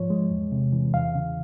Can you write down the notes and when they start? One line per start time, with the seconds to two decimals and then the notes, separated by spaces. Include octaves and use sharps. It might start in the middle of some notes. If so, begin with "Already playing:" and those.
Already playing: G#2 F3 C#5
0.10 G#3
0.31 E2
0.52 C3
0.73 E3
0.94 E2 F5
1.15 C#3